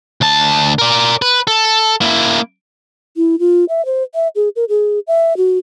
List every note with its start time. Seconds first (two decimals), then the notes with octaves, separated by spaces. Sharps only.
0.21 D2 A5
0.79 A#4 D5
1.22 B4
1.47 A4
2.01 A#3 E4
3.17 E4
3.39 F4
3.69 E5
3.86 C5
4.15 E5
4.36 G#4
4.56 A#4
4.69 G#4
5.07 E5
5.37 F#4